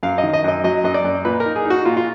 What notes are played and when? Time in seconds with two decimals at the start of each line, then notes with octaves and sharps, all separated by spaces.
0.03 F#2 F5
0.18 D#5
0.23 D#3
0.33 D#5
0.44 F#2 D#5
0.64 F#3 D#5
0.84 F#2 D#5
0.94 D5
1.05 F#2
1.25 A#2 B4
1.40 A#4
1.46 D#4
1.56 G#4
1.65 D#4 F#4
1.85 A#2 F4
1.97 F4